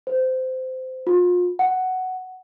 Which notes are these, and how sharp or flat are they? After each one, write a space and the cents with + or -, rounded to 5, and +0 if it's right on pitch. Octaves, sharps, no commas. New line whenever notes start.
C5 -20
F4 +35
F#5 +5